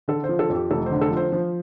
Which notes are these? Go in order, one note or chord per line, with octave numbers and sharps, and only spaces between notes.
D3 A4
C5
F3
A4
F2
G4
F1 A4
D3 C5
A4
F3
C5
F3 C5